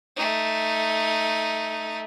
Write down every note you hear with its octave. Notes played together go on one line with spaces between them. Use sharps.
A3 D#4